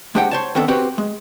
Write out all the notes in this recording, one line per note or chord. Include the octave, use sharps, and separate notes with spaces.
G#3 D4 G4 C5 F#5 G5
C5 C#5 A5
D#3 B3 C4 D4 A4
C4 F#4 G4 B4 C5
G#3